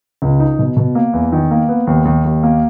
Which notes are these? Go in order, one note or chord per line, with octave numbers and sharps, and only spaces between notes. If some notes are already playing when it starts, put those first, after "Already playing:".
C#2
D#4
B2
B2
A#3
E2
D#3
A#3
B3
D#2
D#2
D#2
A#3